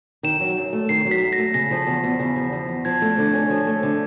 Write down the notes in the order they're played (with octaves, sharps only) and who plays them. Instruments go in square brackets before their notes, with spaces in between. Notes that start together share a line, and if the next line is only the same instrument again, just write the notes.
[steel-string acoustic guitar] D#3 [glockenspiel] E7
[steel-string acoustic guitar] F#3
F#2
A3
[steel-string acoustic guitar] D#3 [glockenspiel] C7
[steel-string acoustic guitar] F#3
[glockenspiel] B6
[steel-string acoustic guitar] F#2
[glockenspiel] A#6
[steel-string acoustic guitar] A3
[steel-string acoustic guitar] C#3 [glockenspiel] A#6
[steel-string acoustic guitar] F3
E2
E2
C#3
F3
E2
E2
[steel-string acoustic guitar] F3 [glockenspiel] G#6
[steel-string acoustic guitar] A3
D3
C#4
F3
A3
D3